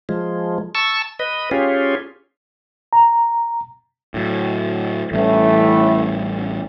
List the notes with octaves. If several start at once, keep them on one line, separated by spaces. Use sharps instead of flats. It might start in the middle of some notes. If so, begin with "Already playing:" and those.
F3 G#3
A5 C#6 E6
B4 D#5
C#4 F4 G4 G#4
A#5
A2 F#3
A1 A2 E3 G3 A3 C#4